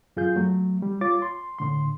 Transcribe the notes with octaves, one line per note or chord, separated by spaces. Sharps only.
F#2 F4 G#4 G6
F#3 A3
G3
F4 C#5 D6 A6
C6
A2 D3 C6